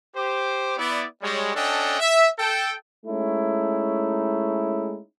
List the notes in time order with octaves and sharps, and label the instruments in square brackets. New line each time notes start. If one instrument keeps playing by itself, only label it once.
[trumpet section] G4 C5 D6
B3 E4 D5
G3 G#3 C#5
C#4 D4 A4 D#5 F#5 G5
E5
A4 G5
[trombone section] G#3 A3 C#4 D#4 E4